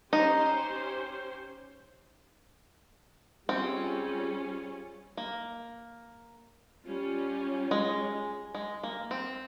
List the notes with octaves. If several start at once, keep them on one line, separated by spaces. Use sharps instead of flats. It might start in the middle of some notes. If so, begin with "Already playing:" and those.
C#4 D#4 G4 C5
G3 C4 C#4 F4 G#4
A#3
G3 C#4 F4
G#3
G#3
A#3
C4